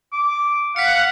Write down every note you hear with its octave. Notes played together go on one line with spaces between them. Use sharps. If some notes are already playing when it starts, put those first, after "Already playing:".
D6
F5 F#5 B6 C#7